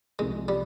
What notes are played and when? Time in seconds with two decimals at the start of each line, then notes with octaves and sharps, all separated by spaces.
0.19 C2 C3 F3 G#3
0.48 G3